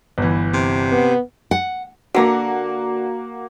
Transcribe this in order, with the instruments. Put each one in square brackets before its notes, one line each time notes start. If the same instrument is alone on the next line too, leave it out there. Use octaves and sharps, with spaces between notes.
[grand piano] G1 E3
[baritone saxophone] C3
[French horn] B3
[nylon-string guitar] F#5
[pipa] D3 A#5 [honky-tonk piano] A#3 F#4